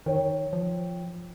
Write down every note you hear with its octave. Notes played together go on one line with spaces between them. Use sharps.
D#3 C#5 G5
F3